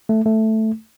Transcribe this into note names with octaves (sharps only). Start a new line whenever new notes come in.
A3
A3